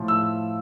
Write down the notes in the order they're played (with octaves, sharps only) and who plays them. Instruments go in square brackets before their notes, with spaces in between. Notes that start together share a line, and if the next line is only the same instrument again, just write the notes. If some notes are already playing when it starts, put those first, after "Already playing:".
Already playing: [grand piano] A2 F3 F4
[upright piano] E6